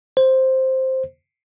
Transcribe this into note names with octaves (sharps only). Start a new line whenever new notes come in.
C5